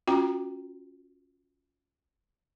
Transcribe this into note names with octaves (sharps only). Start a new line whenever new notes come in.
C#4 F4 F#4 G5 A#5